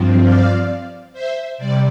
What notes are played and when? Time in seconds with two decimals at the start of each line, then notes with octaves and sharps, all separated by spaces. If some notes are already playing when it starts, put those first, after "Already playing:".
Already playing: G2 F3 C4
0.21 D5 F5
1.13 C5 E5
1.58 C3 G3 D5